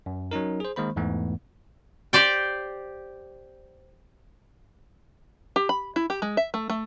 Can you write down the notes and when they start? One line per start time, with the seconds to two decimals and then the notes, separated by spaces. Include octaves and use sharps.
0.06 F#2
0.31 F#3 C#4 D#4 A#4
0.60 G#4 C5
0.76 D#3 G#3 A#3 C5 B5
0.96 E2 G#2 E3 A3 B3
2.13 G4 C5 D5 G5
5.56 G4
5.69 B5
5.96 E4
6.10 G4
6.22 G#3
6.37 E5
6.54 A3
6.70 A3